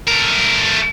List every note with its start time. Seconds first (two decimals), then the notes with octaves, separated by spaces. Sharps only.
0.07 A3 A#4